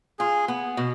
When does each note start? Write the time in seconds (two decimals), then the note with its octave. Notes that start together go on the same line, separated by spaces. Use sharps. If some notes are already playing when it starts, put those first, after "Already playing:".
0.19 F4 G#4
0.48 B3
0.77 B2